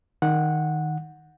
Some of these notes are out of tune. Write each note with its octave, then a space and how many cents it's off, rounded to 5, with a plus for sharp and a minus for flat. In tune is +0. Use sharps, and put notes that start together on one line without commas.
D#3 +0 F#5 -15